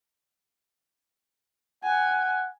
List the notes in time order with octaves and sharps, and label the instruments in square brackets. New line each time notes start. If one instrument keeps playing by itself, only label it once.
[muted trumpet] F#5 [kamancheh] G#5